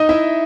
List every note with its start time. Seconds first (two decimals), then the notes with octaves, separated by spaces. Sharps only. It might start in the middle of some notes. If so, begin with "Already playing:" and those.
Already playing: D#4 D#5
0.09 E4 E5